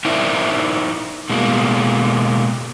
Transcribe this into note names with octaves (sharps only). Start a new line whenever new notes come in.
D#4 E4 A#4 C5 D5 E5
B2 G#3 A#3